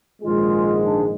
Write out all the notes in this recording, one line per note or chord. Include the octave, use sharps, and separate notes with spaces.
A#1 G#2 D#3 G#3 F4
D4